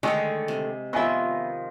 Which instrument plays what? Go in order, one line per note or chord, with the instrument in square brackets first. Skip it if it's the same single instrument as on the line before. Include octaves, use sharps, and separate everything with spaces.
[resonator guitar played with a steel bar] D3 D#3 A3 [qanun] G#3 C#5
[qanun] C3
[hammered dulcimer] D#3 F3 [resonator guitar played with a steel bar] B3 E5 [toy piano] F4 G#5 C#6